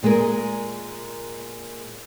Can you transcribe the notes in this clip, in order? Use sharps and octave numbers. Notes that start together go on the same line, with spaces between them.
A#2 G#3 G#4 A#4